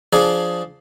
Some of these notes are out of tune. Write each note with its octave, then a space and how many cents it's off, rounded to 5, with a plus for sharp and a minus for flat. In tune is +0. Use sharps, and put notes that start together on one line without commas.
F3 +0 D4 +0 G#4 +10